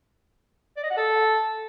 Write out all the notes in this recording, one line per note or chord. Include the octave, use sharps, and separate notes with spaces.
D5
D#5
F#5
A4